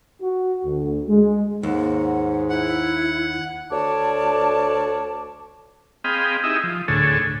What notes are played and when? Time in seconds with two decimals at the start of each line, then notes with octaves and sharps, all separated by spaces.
0.21 F#4
0.65 D2
1.08 G#3
1.63 D#2 G#2 F#5
2.50 E4 F#5
3.71 D2 C#5 D5 A5
6.04 C4 G#4 D#5 F5 G5 B5
6.44 D#4 E4 G4 G#4 D#5 E5
6.64 F3
6.88 D2 A2 D3 G#4 A4 C#5